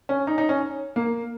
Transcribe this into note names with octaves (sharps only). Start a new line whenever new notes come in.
C#4
D#4
D#4
C#4
A#3